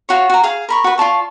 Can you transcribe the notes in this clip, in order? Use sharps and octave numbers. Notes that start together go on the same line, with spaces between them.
F4 F#4 C#5
F#4 A#5
G#4 F5
A#4 B5 C#6
F#4 B4
F4 D5 A5 C#6